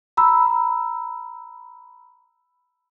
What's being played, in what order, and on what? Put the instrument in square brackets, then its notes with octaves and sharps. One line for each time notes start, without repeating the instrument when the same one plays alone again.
[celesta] A#5 B5 E6